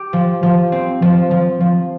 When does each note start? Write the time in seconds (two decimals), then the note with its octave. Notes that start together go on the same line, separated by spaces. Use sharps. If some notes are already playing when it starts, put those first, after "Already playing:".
Already playing: G4
0.13 F3
0.43 F3
0.72 C4
1.02 F3
1.31 F3
1.60 F3